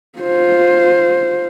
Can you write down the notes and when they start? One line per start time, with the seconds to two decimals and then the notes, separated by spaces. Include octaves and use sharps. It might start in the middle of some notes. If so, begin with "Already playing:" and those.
0.19 F4 C5